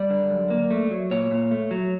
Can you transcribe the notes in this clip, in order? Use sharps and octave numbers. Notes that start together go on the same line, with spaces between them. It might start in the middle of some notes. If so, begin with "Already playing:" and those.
Already playing: G3 D5
D3
F#2
A#3
A3
F#3
A#2 C#5
A#2
A3
F#3